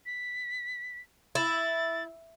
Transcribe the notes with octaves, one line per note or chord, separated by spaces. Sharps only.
B6
E4 A6